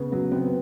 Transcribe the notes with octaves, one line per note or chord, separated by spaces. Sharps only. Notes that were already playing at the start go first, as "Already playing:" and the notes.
Already playing: C#3 B3
F#3 B3
B3 C4